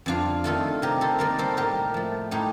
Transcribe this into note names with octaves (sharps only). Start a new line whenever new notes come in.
F2 D4 F4
D#3 A3 F4 A4
C3 G4 A#4
A4 C5
D#3 G3 A#3 A#4 D5
A4 C5
A2 G4 A#4
F3 A3
A2 D#4 G4